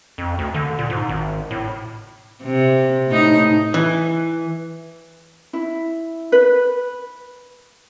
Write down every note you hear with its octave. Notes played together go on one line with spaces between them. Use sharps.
F2
D2
D3
A#2
G#2
G#1
A2
C3
A2 D#4
E3
E4
B4